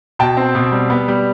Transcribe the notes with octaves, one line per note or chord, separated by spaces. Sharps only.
B2 G5 A5
C4
B2
G3
B3
G3